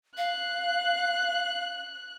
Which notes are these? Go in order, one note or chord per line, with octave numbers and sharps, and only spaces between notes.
F5 F#6